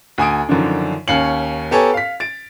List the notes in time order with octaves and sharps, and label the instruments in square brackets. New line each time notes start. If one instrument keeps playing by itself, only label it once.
[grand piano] D2 G#5 D#6 D7
F#2 D3 D#3 F3 D4
D#2 C#4 F5 C#7 F#7
B3 G4 A4 C#5 G#5 A#5
F5 B6
A6 D7